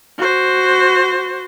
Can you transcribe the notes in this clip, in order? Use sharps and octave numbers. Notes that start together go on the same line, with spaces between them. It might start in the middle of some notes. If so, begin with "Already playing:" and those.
F#4 C5